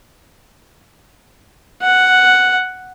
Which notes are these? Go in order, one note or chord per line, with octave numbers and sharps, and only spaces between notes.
F#5